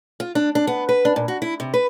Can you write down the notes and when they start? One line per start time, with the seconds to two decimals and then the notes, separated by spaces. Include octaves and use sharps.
0.20 F4
0.35 D4
0.55 D4
0.67 B3
0.89 B4
1.05 D4
1.16 A#2
1.28 F#4
1.42 E4
1.60 C3
1.74 B4